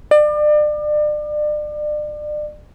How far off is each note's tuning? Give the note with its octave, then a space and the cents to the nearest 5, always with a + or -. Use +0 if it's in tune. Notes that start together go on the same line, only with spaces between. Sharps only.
D5 +35